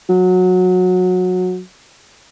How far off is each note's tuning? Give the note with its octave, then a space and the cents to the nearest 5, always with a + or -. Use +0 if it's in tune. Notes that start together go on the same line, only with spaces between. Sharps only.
F#3 -20